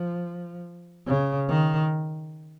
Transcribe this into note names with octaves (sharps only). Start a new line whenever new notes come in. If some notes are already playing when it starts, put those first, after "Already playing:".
Already playing: F3
C#3
D#3